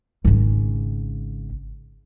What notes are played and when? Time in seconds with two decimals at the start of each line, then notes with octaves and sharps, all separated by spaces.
0.25 G#1 C#3